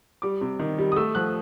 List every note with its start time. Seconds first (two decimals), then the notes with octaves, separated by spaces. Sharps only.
0.22 G3 D6
0.41 C3
0.59 D#3
0.79 G3
0.92 D#6
0.96 A3 E6
1.15 F3 F#6